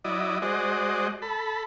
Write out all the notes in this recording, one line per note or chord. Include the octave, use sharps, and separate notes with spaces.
F#3 E4 D5 D#5
G#3 F#4 C5 D5 D#5
A4 B5